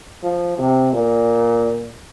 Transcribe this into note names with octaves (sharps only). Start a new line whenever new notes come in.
F3
C3
A#2